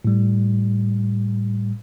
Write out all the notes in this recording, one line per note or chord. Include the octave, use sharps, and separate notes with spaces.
A2 G3